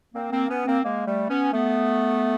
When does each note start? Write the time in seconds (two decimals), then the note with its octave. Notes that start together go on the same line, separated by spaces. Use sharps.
0.14 A#3 C4
0.32 A#3 C4
0.50 B3 C#4
0.67 A#3 C4
0.84 G#3 A#3
1.07 G3 A3
1.30 B3 C#4
1.53 A3 B3